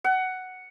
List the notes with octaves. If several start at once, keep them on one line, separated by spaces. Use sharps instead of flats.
F#5